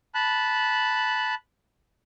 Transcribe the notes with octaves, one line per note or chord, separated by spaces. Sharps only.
A5 B5 F#6